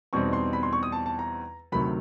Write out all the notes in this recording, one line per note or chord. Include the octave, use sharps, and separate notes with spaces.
E2 B2 G3 C4 D#4 C#6
C6
B5
C6
C#6
D#6
A5
A5
A#5
D2 C3 D#3 F#3 B5